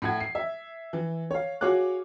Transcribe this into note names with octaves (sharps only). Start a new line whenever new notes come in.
A2 F#5 G#6
C7
E5
E3
C#5 F5
F#4 G#4 C#5 F5 D6 F#6